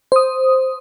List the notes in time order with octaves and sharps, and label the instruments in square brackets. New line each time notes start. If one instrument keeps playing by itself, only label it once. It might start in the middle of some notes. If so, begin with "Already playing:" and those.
[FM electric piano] C5 D#6